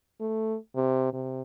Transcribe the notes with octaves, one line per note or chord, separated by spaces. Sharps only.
A3
C3
C3